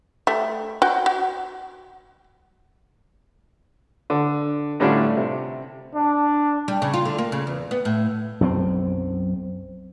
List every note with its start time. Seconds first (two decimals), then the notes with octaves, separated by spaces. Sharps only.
0.27 A3 G4
0.82 F#4 G5
1.06 F#4
4.10 D3
4.80 A2 D3 G3 C#4 D4 F4
5.17 C3
5.95 D4
6.68 G3
6.82 C#3
6.94 F4
7.05 D3
7.18 A#3
7.32 C#3
7.47 E2
7.71 B3
7.85 A2
8.40 B1 F#2 F#3 C4